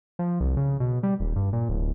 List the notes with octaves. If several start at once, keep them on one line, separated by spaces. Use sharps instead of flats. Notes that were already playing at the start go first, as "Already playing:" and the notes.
F3
C2
C#3
B2
G3
D#1
G2
A#2
D1